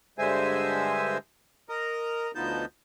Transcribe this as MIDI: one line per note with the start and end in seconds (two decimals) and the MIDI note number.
0.18 1.18 43
0.18 1.18 50
0.18 1.18 56
0.18 1.18 72
0.18 1.18 76
0.18 1.18 80
1.69 2.31 70
1.69 2.31 75
1.69 2.31 82
2.35 2.65 38
2.35 2.65 53
2.35 2.65 59
2.35 2.65 63
2.35 2.65 81
2.35 2.65 91